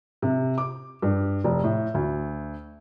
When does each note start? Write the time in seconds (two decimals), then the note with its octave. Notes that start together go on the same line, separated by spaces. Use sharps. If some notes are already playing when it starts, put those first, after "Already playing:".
0.22 C3
0.58 D6
1.02 G2
1.44 F1
1.64 A2
1.94 D2